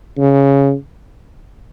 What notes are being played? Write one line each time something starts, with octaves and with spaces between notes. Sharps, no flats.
C#3